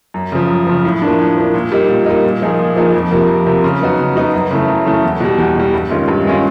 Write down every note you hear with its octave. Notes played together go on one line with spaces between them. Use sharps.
F#2
C#3 F3
F#2
C#3 F3
A2
F3 A#3 D4
A2
F3 A#3 D4
A#2
G3 A#3 D#4
A#2
G3 A#3 D#4
A#2
F3 A#3 D#4 G#4
A#2
F3 A#3 D#4 G#4
F2
C3 F3 A#3
F2
C3 F3 A#3
C#3
F#3 B3 D#4 F#4
C#3
F#3 B3 D#4 F#4
F#2
C#3 E3 A3
F#2
C#3 E3 A3
E2
B2 G3
E2
B2 G3
G2
D#3 G#3 C#4 F4
G2
D#3 G#3 C#4 F4